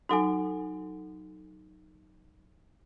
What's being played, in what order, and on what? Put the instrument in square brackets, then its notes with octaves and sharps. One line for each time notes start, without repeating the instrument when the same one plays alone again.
[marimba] F#3 D#4 [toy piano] F#4 A4 G#5